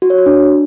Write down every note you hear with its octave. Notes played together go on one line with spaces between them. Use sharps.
F#4
C#5
F#4
D4